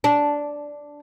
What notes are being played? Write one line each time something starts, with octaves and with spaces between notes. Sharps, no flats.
D4